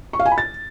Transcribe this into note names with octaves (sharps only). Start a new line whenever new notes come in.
C#6
F5
G#5
B5
A6